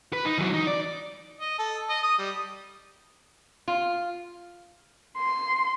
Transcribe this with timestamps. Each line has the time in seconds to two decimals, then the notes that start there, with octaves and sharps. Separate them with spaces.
0.13 B4
0.25 D#4
0.38 E3 F#3
0.53 D#4
0.67 D5
1.40 D#5
1.58 A4
1.90 D#5
2.03 D#6
2.18 G3
3.68 F4
5.17 C6